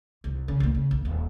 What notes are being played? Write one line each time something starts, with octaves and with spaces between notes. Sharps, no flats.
C2
C#3
C2 A#2
C#3
B1
D#1